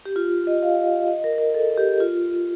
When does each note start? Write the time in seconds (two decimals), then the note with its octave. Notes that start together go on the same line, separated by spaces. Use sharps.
0.06 G4
0.16 F4
0.47 D#5
0.63 F5
1.08 D#5
1.24 A#4
1.38 A#4
1.54 A4
1.77 G4
2.00 F4